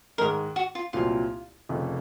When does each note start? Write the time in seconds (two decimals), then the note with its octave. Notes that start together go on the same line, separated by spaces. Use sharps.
0.18 G#2 D#3 G#3 A#4
0.56 F#4
0.75 F4
0.93 C2 A#2 F#3 C4 F4
1.69 F1 F2 C#3